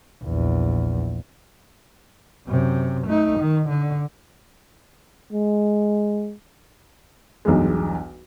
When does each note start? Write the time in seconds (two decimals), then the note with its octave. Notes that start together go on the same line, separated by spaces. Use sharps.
0.24 A#1 E2
2.48 F#2 C3
3.06 A3 D#4
3.39 D#3
3.69 D3
5.33 G#3
7.45 B1 E2 G2 G#3